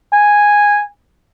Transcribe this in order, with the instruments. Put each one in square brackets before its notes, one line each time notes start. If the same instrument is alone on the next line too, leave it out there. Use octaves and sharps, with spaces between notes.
[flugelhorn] G#5